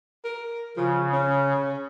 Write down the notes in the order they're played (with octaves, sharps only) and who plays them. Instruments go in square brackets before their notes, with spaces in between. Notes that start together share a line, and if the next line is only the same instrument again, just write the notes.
[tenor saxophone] A#4
[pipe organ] C#3 [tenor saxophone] F3
[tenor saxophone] C#4